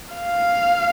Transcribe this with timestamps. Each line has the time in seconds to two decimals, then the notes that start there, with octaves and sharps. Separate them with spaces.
0.15 F5